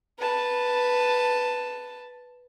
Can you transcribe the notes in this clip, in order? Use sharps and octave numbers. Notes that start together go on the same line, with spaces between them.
B4 A5